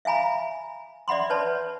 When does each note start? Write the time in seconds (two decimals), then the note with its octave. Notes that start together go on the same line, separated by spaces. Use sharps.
0.05 E5 F5 G#5 A#5 B5
1.08 D5 E5 F#5 B5 C6
1.30 B4 C#5 A5